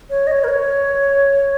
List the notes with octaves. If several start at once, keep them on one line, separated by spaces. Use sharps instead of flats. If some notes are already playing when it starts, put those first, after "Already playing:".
C#5
D#5
C#5
A#4
C#5